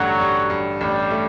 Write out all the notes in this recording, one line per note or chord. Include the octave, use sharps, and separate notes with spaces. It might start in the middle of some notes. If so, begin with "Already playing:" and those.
Already playing: A1 G2 D3 F#3 A3
G2
G2
A1 G3
A3